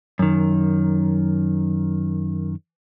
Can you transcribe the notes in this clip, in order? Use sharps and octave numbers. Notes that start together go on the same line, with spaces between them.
F#2 D#3